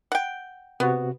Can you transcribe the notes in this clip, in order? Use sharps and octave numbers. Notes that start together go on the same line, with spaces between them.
F#5 G5
C3 B3 F#4